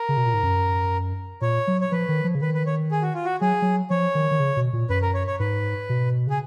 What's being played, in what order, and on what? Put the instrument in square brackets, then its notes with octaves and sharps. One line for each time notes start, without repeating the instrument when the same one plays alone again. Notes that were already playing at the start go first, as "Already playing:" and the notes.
Already playing: [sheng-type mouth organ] A#4
[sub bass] C#3
B2
A#2
G#2
F#2
[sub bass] A#2 [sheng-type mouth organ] C#5
[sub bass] F#3
[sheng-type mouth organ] C#5
[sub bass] F3 [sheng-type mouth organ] B4
[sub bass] D#3
F3
C#3
[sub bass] D#3 [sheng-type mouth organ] B4
[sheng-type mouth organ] B4
C#5
G#4
F#4
F4
F#4
[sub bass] F#3 [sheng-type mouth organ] G#4
[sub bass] F#3
[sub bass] F3 [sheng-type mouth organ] C#5
[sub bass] D#3
D#3
C#3
B2
A#2
[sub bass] F#2 [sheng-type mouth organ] B4
[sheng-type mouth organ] A#4
C#5
C#5
[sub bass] G#2 [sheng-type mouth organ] B4
[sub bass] B2
[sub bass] C#3 [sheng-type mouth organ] G#4